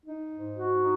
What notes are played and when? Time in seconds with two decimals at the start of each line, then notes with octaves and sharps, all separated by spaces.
0.05 D#4
0.31 G#2
0.55 F#4
0.80 D#4